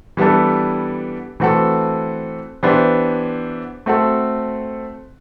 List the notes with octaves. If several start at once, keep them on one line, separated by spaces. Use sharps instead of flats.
E3 G3 B3 D4 A4
E3 A3 C4 F#4 A4
E3 B3 D4 G4 C5
A3 C4 F#4 A4